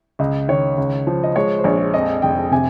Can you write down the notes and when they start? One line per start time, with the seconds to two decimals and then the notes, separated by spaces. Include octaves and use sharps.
0.19 C#2 D#5
0.48 D#3 C#5
0.78 C#2
1.07 F3
1.24 D#5
1.36 G#3 C#5
1.59 C5
1.64 A#1 C#5
1.94 F2 D#5
2.22 F1 G5
2.51 C3 G#5